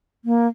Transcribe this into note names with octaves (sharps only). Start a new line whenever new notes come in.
A#3